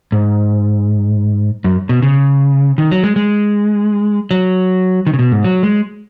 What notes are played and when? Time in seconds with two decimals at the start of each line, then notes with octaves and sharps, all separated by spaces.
0.12 G#2
1.64 F#2
1.89 B2
2.02 C#3
2.78 D#3
2.91 F#3
3.04 G#3
3.16 G#3
4.31 F#3
5.07 D#3
5.14 C#3
5.19 B2
5.32 G#2
5.44 F#3
5.63 G#3